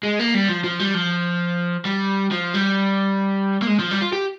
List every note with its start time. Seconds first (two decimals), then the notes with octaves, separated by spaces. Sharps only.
0.03 G#3
0.19 A#3
0.34 G3
0.49 F3
0.64 F3
0.80 G3
0.95 F3
1.85 G3
2.32 F3
2.55 G3
3.62 A#3
3.67 G#3
3.79 F3
3.91 G3
4.02 F4
4.13 G4